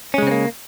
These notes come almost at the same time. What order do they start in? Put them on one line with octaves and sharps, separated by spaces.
C#4 G#3 C#3 C4 A#3